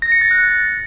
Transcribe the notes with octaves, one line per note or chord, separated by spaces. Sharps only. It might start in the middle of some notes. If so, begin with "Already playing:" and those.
A#6
C#7
A6
F#6
C#7